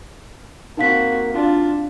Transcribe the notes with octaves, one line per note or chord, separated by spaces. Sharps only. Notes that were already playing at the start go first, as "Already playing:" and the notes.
A#3 C4 D#4 F#4 F5 B6
D4 F4